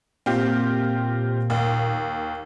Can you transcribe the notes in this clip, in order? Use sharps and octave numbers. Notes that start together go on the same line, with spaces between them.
A#2 C4 F4 G4
D#2